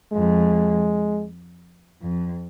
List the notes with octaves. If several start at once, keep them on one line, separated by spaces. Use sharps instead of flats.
F2 G#3
F2